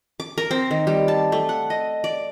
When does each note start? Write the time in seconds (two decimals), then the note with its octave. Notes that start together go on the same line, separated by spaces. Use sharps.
0.20 D6
0.38 A#4
0.51 C4
0.71 D#3
0.87 G3
1.08 A5
1.32 A3
1.49 F#5
1.70 D#5
2.04 D5